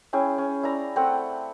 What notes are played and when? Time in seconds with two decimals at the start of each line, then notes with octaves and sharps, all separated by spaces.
0.13 C#4 E4 G#4 G5
0.38 C#4
0.63 E4 D5 A#5
0.96 A3 C4 F#5 G5